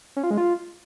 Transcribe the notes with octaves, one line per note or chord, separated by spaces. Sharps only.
C#4
F4
G#3
F4